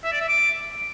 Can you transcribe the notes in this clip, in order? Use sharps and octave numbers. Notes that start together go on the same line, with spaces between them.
E5
D5
E5
D6